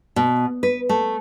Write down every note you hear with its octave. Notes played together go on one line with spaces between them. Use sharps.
B2
B4
A3